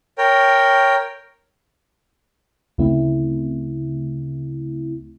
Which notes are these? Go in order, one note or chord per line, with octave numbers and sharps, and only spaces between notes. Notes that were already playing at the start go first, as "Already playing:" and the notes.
A#4 C#5 G5
D2 C#3 A3 C4 E4